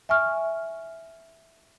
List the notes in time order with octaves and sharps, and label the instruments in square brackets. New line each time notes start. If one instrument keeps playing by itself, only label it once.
[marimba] E5 G#5 C#6 F6